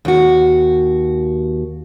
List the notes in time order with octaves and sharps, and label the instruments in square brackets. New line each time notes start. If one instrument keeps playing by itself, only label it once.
[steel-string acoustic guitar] D#2 F#4